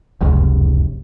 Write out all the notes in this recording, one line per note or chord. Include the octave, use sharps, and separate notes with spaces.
F1 C#2 F#2 C3